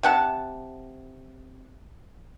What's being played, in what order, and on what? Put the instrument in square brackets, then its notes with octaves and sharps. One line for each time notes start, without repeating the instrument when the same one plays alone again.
[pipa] C3 F#5 A5